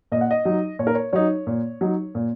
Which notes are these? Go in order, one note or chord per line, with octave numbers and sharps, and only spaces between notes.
A#2 D#5
F#5
D#5
F#3 D#4
A#2 C#5
A#4
C#5
F#3 D#4 C#5
A#2
F#3 D#4
A#2